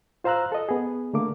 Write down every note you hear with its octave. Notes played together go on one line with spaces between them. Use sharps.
F4 C5 F5 A#5 E6 F#6
A4 D#5
B3 G#4
D3 A3 A#3 D6